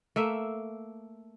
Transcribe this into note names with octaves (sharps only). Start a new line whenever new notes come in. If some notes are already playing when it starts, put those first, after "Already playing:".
A3 A#3 E5